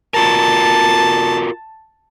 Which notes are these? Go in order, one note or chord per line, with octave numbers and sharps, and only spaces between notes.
F4 F#4 A#4 A5